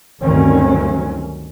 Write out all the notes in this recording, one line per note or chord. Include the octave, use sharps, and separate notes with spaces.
D2 G2 D#3 F#3 C4 C#4